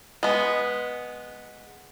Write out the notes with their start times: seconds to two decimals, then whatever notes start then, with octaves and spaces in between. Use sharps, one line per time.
0.23 G#3 B3